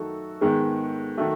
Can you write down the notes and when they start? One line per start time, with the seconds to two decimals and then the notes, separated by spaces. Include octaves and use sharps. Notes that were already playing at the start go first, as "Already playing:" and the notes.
Already playing: F#2 D#3 A3 D#4 F#4 A4
0.41 G#2 D#3 G#3 B3
1.17 D#3 F#3 A3 F#4 A4